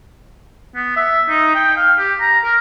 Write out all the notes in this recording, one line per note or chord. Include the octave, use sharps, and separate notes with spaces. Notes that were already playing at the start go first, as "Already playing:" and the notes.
B3
E5
D#4
G5
F5
G4
A#5
A#4